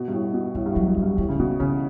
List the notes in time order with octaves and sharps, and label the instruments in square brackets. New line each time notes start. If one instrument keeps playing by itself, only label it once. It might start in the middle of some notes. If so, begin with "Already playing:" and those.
Already playing: [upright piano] B2
G2
A2
B2
[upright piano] A2 [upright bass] G3
[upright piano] G2
[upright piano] A2 [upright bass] F#3
[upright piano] G2
[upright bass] F#3
[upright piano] G2
[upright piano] A2 [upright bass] G3
[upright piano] C#3
[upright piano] B2 [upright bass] G3
[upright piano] C#3 [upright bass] E3